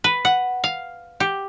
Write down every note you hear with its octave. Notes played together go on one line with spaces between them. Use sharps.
B4
F#5
F5
G4